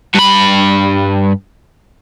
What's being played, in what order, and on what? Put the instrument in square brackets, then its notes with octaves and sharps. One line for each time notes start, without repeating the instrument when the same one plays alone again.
[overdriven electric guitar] G2 B5